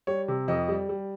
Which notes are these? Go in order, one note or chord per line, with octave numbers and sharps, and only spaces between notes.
G3 C#5
C3
F2 D#5
G3
G3